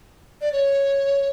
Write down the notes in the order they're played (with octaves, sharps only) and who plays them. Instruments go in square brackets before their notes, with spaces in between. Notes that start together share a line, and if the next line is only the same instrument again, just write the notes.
[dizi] D5
C#5